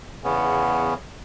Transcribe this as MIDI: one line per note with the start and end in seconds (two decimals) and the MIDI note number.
0.24 0.94 40
0.24 0.94 49
0.24 0.94 59
0.24 0.94 61